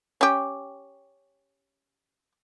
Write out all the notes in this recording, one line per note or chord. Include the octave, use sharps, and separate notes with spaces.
C#4 G4